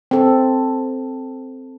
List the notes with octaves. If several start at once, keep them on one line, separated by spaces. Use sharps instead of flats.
C4 A4